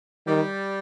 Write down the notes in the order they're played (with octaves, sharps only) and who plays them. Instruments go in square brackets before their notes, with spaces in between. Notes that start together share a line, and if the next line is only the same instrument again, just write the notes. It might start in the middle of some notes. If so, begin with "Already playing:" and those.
[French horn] D#3 [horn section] G3